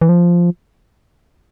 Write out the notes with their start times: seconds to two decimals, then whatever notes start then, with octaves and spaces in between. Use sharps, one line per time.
0.01 E3
0.09 F3